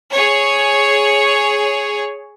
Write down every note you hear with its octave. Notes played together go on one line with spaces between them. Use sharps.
G#4 C#5